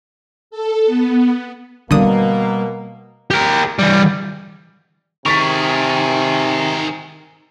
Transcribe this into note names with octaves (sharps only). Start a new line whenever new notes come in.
A4
B3
B2 D3 G3 A#3 D#6
G4 A#4
E3 G3
C3 D#3 G#4 A#4 C#6 A6 B6